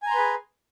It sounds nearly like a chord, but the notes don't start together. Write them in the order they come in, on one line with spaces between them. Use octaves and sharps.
G#5 A#5 C6 B4 G#4